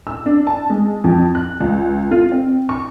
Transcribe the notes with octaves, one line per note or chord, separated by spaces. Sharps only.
E6
D4
A5
G#3
F2
F#6
C#2
F4
C4
C#6